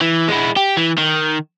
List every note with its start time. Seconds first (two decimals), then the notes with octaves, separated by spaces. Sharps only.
0.01 E3
0.28 G#3 E4
0.56 G4
0.77 E3
0.98 D#3